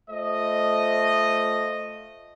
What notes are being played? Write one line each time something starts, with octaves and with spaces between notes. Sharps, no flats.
A3 F4 C5 D#5